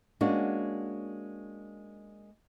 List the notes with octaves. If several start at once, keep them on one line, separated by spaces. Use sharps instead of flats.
G#3 A#3 C#4 D4 F#4